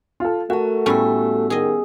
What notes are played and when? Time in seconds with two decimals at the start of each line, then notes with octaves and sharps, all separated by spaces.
0.20 F4 A4
0.50 A3 F#4 A#4 A5
0.86 A2 G3 B3 C#4 F#5 E6
1.50 D#3 G#4 D#5